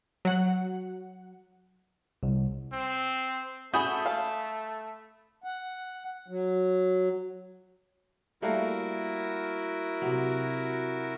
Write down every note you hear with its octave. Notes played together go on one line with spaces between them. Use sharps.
F#3 F#5
C2
C4
A3 F#4 G#4 A5 B5 D#6 G6
F5 A5
F#5
F#3
G3 A3 A#3 E4 F#4 A#4
C3 F#3